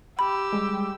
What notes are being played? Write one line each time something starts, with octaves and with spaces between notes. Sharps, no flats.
G4 B5 E6
G3 G#3